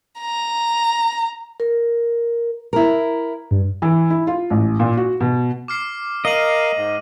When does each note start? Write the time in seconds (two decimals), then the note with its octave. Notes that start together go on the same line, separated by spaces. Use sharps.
0.21 A#5
1.60 A#4
2.73 E4 A#4
3.51 G2
3.82 E3
4.10 E4
4.27 F4
4.51 A1
4.80 A#2
4.97 F#4
5.20 B2
5.68 D6 F6 C7
6.25 A#4 D#5 F5 D#7 F#7
6.78 G#2